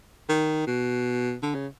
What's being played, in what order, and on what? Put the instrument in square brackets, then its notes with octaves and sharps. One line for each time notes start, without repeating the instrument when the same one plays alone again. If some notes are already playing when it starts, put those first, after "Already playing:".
[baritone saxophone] D#3
B2
D3
C#3